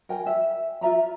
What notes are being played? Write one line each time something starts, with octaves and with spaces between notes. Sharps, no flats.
A#4 G5 G#5
E5
F4 E5 A#5 B5